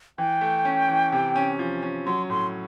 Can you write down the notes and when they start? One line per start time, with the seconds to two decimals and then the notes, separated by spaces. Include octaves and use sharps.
0.18 E3 G5
0.41 A3
0.65 C#4
0.88 E3
1.12 C3
1.36 C#4
1.59 F3
1.83 C#4
2.06 F#3 C6
2.30 A2 C6